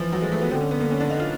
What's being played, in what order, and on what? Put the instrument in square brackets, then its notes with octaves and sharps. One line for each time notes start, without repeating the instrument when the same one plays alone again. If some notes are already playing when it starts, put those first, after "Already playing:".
Already playing: [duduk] E3 [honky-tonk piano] F3
[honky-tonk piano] F#3
G#3
A3
B3
[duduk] D3 [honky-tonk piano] C4
[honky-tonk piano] C#4
B3
A#3
C#4
D4
D#4
F4